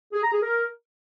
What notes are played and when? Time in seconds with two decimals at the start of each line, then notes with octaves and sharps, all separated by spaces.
0.13 G#4
0.23 A#5
0.32 G#4
0.42 A#4